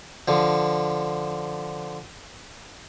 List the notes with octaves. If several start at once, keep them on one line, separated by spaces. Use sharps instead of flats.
D3 F3